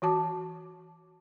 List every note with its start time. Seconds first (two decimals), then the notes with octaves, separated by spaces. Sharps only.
0.02 E3 F#4 A5 D6